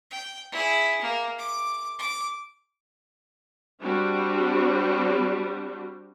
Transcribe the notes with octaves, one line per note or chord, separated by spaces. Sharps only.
G5
E4 G#4
A#3
D6
D6
G3 C4 D4 F#4